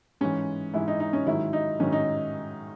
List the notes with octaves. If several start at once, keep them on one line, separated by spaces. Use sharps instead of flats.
G#2 E3 C#4
G#2 E3 E4
D#4
D#4
C#4
G#2 D#3 F#3 E4
D#4
G#2 D#3 F#3 C#4
D#4